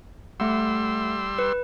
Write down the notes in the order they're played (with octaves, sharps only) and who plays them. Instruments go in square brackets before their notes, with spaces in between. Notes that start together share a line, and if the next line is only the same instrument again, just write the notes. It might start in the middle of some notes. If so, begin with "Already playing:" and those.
[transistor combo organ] G3 C6 E6 [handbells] A3 F#5
[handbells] B4